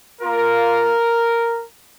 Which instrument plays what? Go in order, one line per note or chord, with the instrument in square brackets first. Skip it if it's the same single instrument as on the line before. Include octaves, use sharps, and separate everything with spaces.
[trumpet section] A#3 F4 A#4